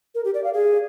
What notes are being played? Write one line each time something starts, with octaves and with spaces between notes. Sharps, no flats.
A#4
G4
D5
F5
G#4